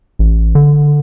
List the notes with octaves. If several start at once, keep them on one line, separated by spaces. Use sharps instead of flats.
A1
D3